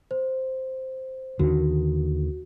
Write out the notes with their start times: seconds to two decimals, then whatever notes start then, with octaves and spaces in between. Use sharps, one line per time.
0.11 C5
1.39 D#2 D3 D#3 F#4